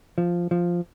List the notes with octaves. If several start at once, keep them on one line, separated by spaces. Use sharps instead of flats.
F3
F3